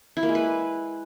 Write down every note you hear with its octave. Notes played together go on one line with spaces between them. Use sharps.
E4
A#3
G#3
B4